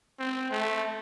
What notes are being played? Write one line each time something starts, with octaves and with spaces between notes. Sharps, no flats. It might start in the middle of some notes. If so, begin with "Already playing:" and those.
C4
A3